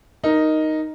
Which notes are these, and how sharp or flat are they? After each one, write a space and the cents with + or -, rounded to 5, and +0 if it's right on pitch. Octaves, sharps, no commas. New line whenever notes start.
D#4 +0 A#4 +0